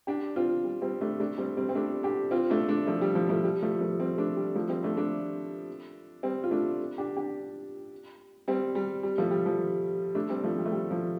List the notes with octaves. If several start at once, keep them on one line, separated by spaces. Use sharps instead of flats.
D4 G4
C4 F4
G3
G3 C4
A3 D4
A3 D4
G3 C4
G3 C4
C4
A3 D4
D4 G4
C4 F4
A3 D4
A3 D4
F3 A3
G3
F3
F3 A3
G3
F3 A3
F3 A3
G3 C4
A3 D4
G3
F3 A3
G3 C4
A3 D4
A3 D4
G3 C4
F4
A3 D4
D4 G4
D4 G4
G3 C4
G3
G3
F3 A3
G3
F3
A3 D4
G3 C4
F3 A3
G3
A3
G3
F3